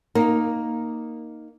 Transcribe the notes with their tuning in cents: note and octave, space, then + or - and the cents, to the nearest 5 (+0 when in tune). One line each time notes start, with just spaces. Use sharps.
A#3 +0 D#4 +0